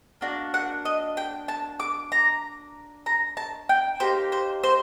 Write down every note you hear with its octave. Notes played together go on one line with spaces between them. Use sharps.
A#3 D4 F#4
F#5
D#5
G5
A5
D6
A#5
A#5
A5
G5
A#3 D#4 G4 C5
C5
C5